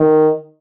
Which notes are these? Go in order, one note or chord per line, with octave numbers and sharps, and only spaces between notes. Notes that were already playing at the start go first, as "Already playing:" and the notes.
Already playing: D#3